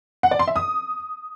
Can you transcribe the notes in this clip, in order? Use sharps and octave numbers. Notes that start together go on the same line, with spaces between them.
F#5
D5
C6
E5
D#6